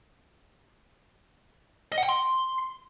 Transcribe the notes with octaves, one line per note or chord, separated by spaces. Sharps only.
D#5
F#5
G5
C6